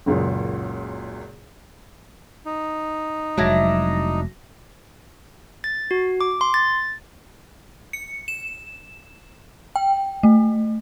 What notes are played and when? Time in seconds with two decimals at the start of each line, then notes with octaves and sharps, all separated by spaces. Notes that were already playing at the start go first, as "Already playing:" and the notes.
0.06 F#1 C#2 F#2 A#2
2.46 D#4
3.38 F1 F#3 G#3 D4 E4 D5 A#6
5.64 A6
5.91 F#4
6.21 D6
6.41 C6
6.54 A6
7.93 C#7
8.28 E7
9.76 G5
10.23 A3